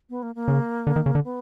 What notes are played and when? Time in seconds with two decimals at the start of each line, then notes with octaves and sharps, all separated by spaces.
0.10 B3
0.23 A#3
0.35 A#3
0.48 C#3
0.87 D3
0.96 D#3
1.06 C#3
1.15 D3
1.24 B3